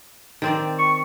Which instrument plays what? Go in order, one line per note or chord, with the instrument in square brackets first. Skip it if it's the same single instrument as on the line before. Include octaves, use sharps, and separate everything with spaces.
[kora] D#3 C4 D5
[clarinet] C#6